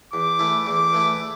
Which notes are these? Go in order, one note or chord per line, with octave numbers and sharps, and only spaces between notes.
E2 D6
E3 A3 E4
E2 D6
E3 A3 E4